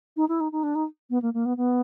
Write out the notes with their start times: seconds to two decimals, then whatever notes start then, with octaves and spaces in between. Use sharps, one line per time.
0.16 D#4
0.29 E4
0.40 D#4
0.52 D#4
0.63 D4
0.75 D#4
1.10 B3
1.22 A#3
1.34 A#3
1.45 B3
1.57 B3